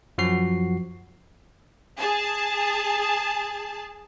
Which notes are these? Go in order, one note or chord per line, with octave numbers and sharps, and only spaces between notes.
F#2 F3 F#4 C7
G#4 A5